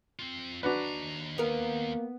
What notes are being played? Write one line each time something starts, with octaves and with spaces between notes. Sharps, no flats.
C4 F4
D#2 D4 F#4 B4 A#5
A#3 B3 A#4